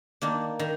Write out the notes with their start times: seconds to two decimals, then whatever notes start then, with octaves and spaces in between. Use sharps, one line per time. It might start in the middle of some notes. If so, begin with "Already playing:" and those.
0.22 D#3 A#3 D4
0.59 D#3